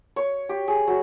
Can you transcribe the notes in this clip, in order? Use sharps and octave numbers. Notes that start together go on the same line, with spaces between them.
C#5
G4
G#4
F#3